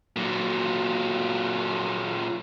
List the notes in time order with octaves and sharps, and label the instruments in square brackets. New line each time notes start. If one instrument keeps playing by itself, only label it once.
[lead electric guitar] A#2 F#3